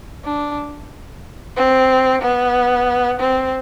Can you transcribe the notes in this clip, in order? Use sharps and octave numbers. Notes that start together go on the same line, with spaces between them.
D4
C4
B3
C4